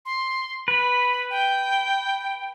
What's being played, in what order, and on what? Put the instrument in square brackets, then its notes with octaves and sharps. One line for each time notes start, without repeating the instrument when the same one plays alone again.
[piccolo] C6
[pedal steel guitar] B4 [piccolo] B5
[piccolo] G5